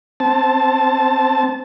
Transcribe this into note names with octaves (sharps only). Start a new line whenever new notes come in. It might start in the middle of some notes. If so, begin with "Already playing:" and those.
C4 A5